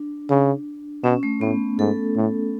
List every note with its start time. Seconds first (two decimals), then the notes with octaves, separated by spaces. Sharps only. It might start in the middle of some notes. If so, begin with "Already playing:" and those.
Already playing: D4
0.30 C#3
1.04 B2 C#4
1.23 A3
1.41 A2 B3
1.79 G#2 A4
2.16 A2